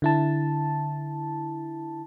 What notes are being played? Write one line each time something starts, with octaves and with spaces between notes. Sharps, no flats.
D3 E4 A5